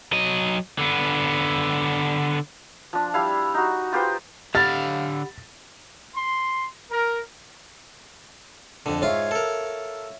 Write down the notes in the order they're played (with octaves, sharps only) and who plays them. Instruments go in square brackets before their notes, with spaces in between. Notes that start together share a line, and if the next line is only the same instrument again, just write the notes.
[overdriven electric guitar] F#3 D#5
D3 B3
[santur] F3 D4
G3 E4 F5
D#4 F#4
F4 G4 B4 C5
[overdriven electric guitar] D3 F5 [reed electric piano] G4 F#5 B5 [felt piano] A6
[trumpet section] C6
A#4
[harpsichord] F2 D3
[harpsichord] G#2 F4 [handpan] C#5 E5 F5
[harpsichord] A4 A#4